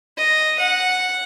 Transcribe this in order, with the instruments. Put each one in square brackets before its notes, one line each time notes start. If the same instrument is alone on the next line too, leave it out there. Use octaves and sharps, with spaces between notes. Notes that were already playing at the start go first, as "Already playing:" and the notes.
[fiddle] D#5
F#5